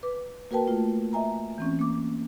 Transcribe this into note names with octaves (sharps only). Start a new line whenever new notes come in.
B4 D6
A#3 F#4 A#4 B4 G5 A5
A3 F4
D#5 E5 G#5 A#5
E3 C4 C#4
A#3 D6